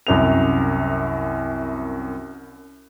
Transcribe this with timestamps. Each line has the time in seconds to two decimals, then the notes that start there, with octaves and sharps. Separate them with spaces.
0.07 C2 F#2 F7